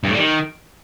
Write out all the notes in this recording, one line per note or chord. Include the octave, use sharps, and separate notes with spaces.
G2
A2
G3
D#3